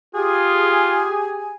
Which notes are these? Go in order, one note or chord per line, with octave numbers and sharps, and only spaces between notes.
F4 G4 G#4 G#5